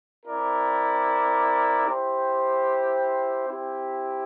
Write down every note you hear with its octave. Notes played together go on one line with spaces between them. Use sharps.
C4 E4 A#4 D5
E4 G4 C5
C4 E4 G4